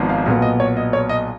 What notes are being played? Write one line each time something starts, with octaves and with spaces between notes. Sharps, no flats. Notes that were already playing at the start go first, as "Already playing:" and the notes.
Already playing: G#1 G#2 F3 B3
F5
B1 A#2 F#3 B3 F5
D#5
C#5
D#5
C#5
D#5